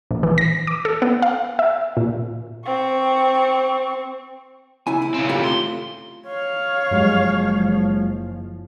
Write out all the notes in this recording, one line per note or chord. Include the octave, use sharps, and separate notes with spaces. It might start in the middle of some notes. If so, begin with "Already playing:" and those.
A#1
E3
A#6
D6
A4
B3
F5
E5
A#2
C4 C#6
C#3 E4 G#5
E4
C#3 C4
A3 F4 G4
C6
C#5 F5
F#1 G2 F3 F#3 G#3